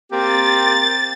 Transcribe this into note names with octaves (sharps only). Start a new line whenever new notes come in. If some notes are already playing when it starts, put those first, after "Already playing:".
A#3 C4 G4 A6